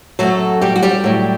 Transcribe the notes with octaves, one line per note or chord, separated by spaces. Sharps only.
F#2 F#3 A3 A4
G3 G4
F#4
G3 G4
A2 F#3